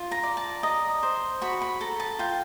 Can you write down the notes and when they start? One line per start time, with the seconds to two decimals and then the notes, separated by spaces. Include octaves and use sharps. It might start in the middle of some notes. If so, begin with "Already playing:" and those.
Already playing: F4
0.11 A#5
0.23 D5
0.37 A5
0.63 D#5 A#5
1.03 C5
1.42 F#4 B5
1.62 B5
1.81 A4 A#5
2.00 A5
2.19 F4 G5